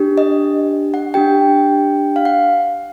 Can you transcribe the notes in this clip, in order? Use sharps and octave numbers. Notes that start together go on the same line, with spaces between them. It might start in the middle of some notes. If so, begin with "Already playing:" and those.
Already playing: D4 G4
D#5
F#5
D4 G4 G5
F5
F#5